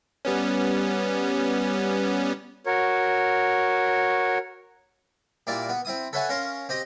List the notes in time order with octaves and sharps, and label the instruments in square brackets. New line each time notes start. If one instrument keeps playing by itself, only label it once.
[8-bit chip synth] G3 B3 C#4
[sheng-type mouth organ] F#4 A#4 C#5
[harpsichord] A#2 G3 A#3 E4 D5
B3
C4 E4 D#6
A4 B4 C#5 E5 F#5 G#5
C#4 A#4 F5 C6
C4 G4 D#5